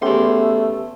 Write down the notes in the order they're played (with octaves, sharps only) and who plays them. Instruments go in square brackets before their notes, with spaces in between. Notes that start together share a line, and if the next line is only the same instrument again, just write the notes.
[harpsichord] E2 C6 [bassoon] A3 [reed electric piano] B3 C#4 G4